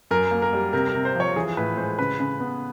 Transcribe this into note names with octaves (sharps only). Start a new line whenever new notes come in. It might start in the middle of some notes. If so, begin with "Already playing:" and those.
F#2 A#4
A#3
A#4
G3
C3 A#4
A#4
C3
C5
F3 C#5
E3 G#4
A2 B4
G#3 C5
C#3 B4
C#3
B3